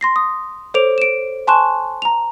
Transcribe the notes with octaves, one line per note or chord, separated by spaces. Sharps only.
C6 A#6 C7
D#6
A4 C5 C#5 D6 D7 F7
D7 E7
G#5 A5 C6 C#6 F#6 E7
A#5 F7